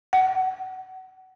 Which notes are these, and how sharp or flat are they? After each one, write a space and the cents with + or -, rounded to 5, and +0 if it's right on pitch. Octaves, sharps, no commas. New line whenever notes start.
F#5 +25